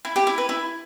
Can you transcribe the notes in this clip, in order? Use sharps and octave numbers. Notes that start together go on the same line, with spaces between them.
E4
G4
E4
B4
E4